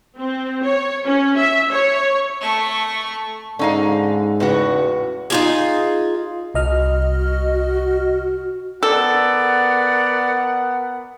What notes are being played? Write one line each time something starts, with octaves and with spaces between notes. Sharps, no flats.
C4
C#5
C#4
E5
C#5
A3 C#6
G#2 D3 C#4 D#4 F5
E2 A2 C#3 F#4
D#4 F4 G#4
C2 F#4 D#5 F6
B3 A4 A#4 D5 F#5